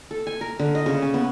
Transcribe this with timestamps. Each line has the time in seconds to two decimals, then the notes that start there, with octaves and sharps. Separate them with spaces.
0.11 A4
0.27 G#5
0.41 A#4
0.59 D3
0.75 D#5
0.86 C#3
1.02 C#4
1.14 B3